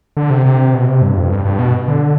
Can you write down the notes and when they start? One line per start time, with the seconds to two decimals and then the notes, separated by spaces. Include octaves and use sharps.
0.17 D3
0.30 C3
0.46 C3
0.74 B2
0.88 C3
1.02 G2
1.17 F2
1.30 G2
1.45 G2
1.59 B2
1.88 D3